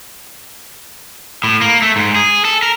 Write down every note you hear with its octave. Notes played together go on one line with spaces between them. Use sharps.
A2
A#3
A3
G#2
G#4
A4
A#4